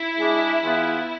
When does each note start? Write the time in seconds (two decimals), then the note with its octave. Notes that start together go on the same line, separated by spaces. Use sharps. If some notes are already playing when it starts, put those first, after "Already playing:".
Already playing: E4
0.18 G#3 D4 G#4
0.62 E3 B3 F4 G#4